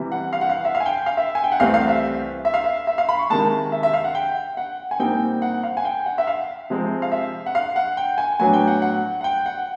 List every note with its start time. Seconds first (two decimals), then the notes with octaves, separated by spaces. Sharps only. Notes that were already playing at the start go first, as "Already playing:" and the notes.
Already playing: C3 E3 G3
0.12 F#5
0.33 F5
0.41 F#5
0.49 F5
0.65 E5
0.75 F5
0.80 G#5
0.86 G5
1.06 F5
1.17 E5
1.35 G#5
1.44 G5
1.52 F#5
1.60 C2 C3 E3 A3 C4 F5
1.74 F5
1.88 E5
2.45 E5
2.54 F5
2.64 E5
2.87 E5
2.98 F5
3.09 B5
3.19 C#6
3.30 C3 D#3 G#3 A5
3.72 E5
3.83 E5
3.94 F5
4.04 F#5
4.15 G5
4.57 F#5
4.91 G#5
4.99 A#2 G3 C4 D#4 G5
5.42 F#5
5.63 F5
5.77 G#5
5.85 G5
6.06 F#5
6.18 E5
6.27 F5
6.70 C3 F3 G#3 C4
7.02 F5
7.12 E5
7.46 F#5
7.55 F5
7.76 F#5
7.97 G5
8.18 G#5
8.39 A2 F#3 B3 D4 G#5
8.53 G5
8.68 F#5
8.82 F#5
9.21 F#5
9.24 G5
9.46 F#5